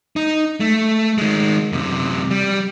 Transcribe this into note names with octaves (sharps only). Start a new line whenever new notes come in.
D#4
A3
D#3 G#3
F#2 C3
G3